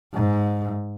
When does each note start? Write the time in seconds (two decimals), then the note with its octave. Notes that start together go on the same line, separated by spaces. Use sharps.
0.14 G#2